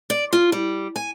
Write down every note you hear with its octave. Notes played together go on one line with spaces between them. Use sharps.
D5
F4
G3
G#5